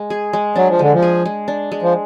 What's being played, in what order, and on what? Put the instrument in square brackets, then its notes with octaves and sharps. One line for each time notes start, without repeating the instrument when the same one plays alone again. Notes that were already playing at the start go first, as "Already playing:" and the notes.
Already playing: [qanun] G#3
G#4
G#3
[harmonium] F#3 [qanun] D4
[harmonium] F3
[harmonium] D3 [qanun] G#3
[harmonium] F3
[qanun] G#4
G#3
D4
G#3
[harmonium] F3